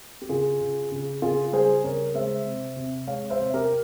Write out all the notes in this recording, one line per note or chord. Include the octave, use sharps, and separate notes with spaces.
G4
C#3 F4 G#4
C#3
C#3
C#3 F4 G#4
G3 G#4 C5
C#3 A#4 C#5
G#3 C5 E5
C3
C3
G#3 C#5 F5
C5 E5
C3
G4 A#4